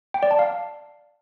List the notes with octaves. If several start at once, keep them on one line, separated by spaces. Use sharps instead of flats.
G5
D5
A5
F5